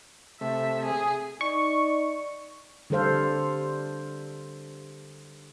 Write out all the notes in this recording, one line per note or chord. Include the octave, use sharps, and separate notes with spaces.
C3 A3 E5
G#4
D#4 D5 C#6
D3 G3 A4 C5 F5